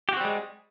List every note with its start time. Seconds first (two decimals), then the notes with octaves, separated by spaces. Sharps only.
0.09 G4
0.13 F#4
0.17 C4
0.21 G3
0.25 G#3